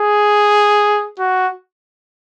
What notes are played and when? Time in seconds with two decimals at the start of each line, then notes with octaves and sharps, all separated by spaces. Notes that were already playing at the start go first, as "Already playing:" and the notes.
Already playing: G#4
1.19 F#4